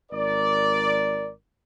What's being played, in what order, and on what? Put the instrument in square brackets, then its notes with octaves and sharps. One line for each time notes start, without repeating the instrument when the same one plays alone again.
[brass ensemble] G#1 A#4 D5